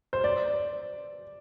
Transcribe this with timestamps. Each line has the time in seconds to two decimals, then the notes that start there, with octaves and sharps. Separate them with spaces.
0.13 C5
0.24 D5